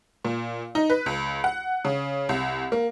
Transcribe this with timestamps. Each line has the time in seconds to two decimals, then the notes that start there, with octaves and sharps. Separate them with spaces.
0.25 A#2
0.75 D#4
0.90 B4
1.06 C#2
1.44 F#5
1.85 C#3
2.29 C2
2.72 A#3